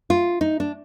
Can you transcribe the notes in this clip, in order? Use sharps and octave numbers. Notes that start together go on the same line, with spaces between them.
F4
D#4
D4